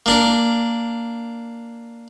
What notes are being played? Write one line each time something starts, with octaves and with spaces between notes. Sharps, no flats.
A#3 D4 A#4